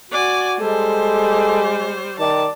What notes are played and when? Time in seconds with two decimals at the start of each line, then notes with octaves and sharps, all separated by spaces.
0.11 F#4 D5 G#5
0.60 G3 G#3 A4 C5
2.19 D#3 D5 A5